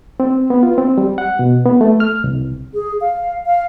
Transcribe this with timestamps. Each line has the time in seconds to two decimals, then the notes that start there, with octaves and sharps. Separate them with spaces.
0.20 C4
0.50 B3
0.63 F4
0.78 C4
0.98 G3
1.18 F#5
1.39 B2
1.66 B3
1.81 A3
2.00 F6
2.24 C2
2.74 G#4
3.01 F5
3.46 F5